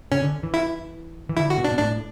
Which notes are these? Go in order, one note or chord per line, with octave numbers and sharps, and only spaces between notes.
C#3 C#4
D3
E3
E4
E3
D3 E4
F#4
B2
D4
B2
A2 D4